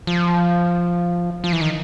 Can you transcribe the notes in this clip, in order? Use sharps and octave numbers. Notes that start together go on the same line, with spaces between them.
F3
F3
E3
D#3